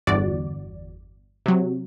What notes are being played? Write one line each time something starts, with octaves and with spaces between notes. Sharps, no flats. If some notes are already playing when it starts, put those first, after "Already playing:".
G1 E2 F#4 D5
C3 F#3